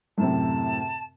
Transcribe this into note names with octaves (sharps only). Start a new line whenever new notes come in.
F#2 A2 C3 A5